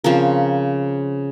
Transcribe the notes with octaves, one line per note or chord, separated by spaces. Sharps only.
C#3 F3 C4 A#4